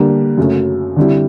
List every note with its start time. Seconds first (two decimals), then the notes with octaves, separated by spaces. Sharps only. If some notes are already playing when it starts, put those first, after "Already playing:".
Already playing: D3 G3 A#3 D4
0.38 F#2 C#3 F#3 A3
0.96 D3 G3 C4 E4